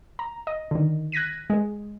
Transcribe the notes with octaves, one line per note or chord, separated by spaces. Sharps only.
A#5
D#5
D3 D#3
F#6 G#6 A#6 B6 D#7
G#3 G#4